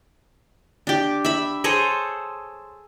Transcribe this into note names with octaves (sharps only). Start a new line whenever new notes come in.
D4 G4
E5 B5
G#4 A4 C5 C#5